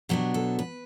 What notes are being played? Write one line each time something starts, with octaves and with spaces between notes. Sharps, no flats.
B2 F#3 B3 D4 G4
A4
B4